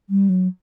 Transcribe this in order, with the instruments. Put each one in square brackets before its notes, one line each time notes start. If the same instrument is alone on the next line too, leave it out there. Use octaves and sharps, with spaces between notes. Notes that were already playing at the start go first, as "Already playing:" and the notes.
[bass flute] G3
F#3